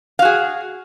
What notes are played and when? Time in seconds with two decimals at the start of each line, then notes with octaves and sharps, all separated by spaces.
0.19 F5
0.22 F#4
0.25 G#4